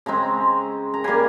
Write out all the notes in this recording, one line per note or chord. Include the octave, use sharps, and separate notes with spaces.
C#3 G#3 C4 A#5
A#5
C#3 G3 A#3 G#5